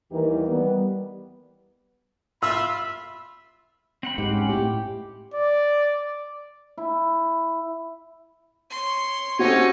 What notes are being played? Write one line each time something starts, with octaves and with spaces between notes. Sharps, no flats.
D#2 E3 G3 D#4 G4 A#4
G3 B3
F4 E5 B5 E6
C4 F#5 B5
G#2 G4
C#4
A2 G4
D5
E4
C#5 C6
C4 C#4 D#4 F#4 G4 A4 C#5 F#5